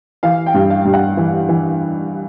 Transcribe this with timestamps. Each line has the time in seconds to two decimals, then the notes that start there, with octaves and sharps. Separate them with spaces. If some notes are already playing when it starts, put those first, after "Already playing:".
0.23 E3 F5
0.46 G5
0.54 G2
0.70 F5
0.85 G2
0.93 F#5
1.17 E3
1.49 E3